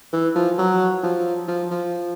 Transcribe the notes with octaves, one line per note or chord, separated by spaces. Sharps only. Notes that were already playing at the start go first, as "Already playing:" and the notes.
E3
F3
F#3
F3
F3
F3